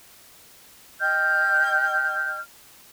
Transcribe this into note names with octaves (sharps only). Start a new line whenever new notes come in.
D#5 G5 F6 G6